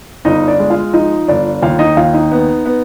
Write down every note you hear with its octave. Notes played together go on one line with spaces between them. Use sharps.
G1 D#4 D#5
D4 D5
G#3
F4 F5
F3 D#4 D#5
G1 D4 D5
D#2 F4 F5
D#4 D#5
D#2 F4 F5
D#4 D#5
B3
B3